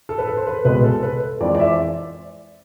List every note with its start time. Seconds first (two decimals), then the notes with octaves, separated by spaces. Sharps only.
0.09 A4
0.18 B4
0.27 A4
0.37 C5
0.47 B4
0.65 C2 B2 G#3 B4
0.84 A4
1.03 B4
1.41 F2 E3 G#3 C4 D5
1.55 D5
1.60 E5